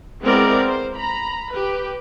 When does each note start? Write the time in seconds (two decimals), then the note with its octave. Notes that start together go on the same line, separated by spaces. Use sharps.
0.22 G#3 B3 C4 E4 A#4 D5
0.67 C5
0.97 A#5 B5
1.52 G4 B4